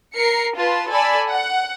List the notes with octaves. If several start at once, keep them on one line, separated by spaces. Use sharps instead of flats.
A#4 C7 C#7
F4 B4 A5
A4 D5 G#5 B5 E6
F#5